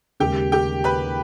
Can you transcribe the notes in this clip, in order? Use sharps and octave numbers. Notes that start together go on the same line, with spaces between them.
D#2 C#3 G#3 G4 G5
G4 G5
B4 B5